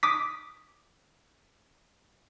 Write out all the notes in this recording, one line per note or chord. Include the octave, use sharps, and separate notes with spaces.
D6 D#6 B6